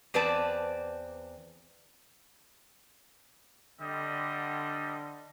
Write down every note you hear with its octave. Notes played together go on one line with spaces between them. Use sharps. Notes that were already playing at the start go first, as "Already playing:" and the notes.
E2 C4 B4 D5 A5
D3 G3 C4 D#5